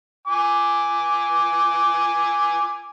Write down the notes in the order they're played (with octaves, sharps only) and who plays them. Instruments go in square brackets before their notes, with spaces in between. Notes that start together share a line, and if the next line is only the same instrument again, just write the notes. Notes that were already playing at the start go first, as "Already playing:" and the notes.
[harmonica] G#5 D6